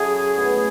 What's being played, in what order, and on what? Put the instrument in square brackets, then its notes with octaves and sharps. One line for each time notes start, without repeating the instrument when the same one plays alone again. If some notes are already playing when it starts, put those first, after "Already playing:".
Already playing: [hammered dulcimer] F#3 C#4 E4 A4 [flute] G#4
[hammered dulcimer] A2 G#3 B3